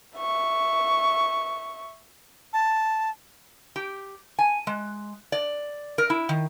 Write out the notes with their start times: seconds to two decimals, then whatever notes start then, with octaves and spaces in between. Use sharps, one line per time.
0.18 E5 C#6
2.53 A5
3.76 G4
4.39 G#5
4.67 G#3
5.32 D5
5.98 A#4
6.10 E4
6.29 D#3